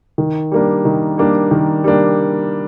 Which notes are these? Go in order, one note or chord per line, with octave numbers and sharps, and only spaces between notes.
D#3
G3 A#3 D4
D#3
G3 A#3 D4
D#3
G3 A#3 D4